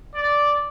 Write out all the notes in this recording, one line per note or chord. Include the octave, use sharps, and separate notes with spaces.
D5